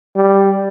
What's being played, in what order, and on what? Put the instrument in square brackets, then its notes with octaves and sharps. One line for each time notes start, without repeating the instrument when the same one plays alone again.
[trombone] G3